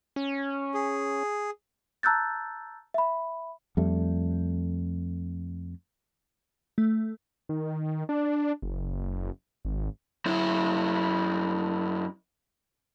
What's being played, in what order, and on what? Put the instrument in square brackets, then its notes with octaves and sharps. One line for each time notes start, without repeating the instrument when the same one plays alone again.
[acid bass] C#4
[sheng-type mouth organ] G#4
[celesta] A5 A#5 E6 F#6 G6 A6
E5 B5
[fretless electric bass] F2 G3 A3
[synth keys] A3
[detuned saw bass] D#3
D4
F#1
G#1
[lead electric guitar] F#2 E4